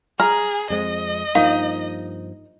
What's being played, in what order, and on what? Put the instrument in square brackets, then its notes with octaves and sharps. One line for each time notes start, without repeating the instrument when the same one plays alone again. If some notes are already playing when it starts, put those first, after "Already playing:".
[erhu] G#4 [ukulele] A#5 [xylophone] F6
[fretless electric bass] F2 G#3 C4 [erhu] D#5
[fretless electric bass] G2 F3 A#3 [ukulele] D#4 [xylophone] F5